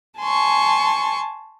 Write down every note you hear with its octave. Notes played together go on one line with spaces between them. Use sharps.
G#5 A5 C6 C#6